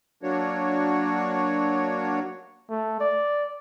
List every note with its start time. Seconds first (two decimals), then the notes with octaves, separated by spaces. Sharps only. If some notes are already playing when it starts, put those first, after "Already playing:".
0.23 F#3 A#3 D4 F#4 C#5
2.70 A3
3.00 D5